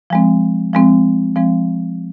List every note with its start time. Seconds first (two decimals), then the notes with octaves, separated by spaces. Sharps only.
0.10 F3 G#3 C4
0.74 F3 G#3 C4
1.36 F3 G#3 C4